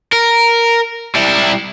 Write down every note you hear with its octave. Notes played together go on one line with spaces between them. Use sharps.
A#4
G3 E4